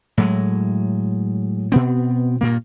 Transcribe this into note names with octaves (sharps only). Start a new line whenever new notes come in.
A2 F#3 G#3
B2 B3 C4
G2 A#2 A#3